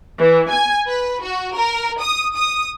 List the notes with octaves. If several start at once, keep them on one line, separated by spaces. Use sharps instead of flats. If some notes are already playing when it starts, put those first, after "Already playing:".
E3
G#5
B4
F#4
A#4
D#6
D#6